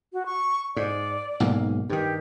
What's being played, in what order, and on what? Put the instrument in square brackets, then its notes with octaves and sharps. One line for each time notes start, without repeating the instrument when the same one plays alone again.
[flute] F#4
C#6
[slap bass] G#2 [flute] D5
[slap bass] B1 G#2 A#3
[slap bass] G2 D#3 [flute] G4